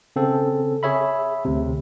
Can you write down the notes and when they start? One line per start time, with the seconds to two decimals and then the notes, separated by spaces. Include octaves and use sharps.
0.16 C#3 C4 A4
0.83 G#4 C#5 E5 B5
1.45 D2 C3